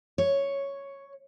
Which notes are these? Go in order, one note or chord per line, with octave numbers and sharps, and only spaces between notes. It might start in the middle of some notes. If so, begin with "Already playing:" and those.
C#5